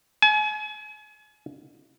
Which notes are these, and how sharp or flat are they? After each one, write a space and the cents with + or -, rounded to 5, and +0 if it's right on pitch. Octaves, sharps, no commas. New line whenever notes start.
G#5 +40